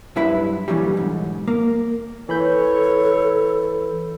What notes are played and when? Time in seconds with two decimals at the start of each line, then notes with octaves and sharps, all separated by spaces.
0.16 G2 F#3 E4 B4 E5 B5
0.68 A#2 D3 E3 F#3 G3
0.97 B1 G#2
1.48 A#3
2.29 E3 A4 C#5 B5 G6